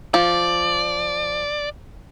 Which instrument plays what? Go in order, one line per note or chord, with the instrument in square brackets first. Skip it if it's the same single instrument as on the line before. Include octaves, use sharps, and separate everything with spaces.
[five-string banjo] F3 [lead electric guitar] D5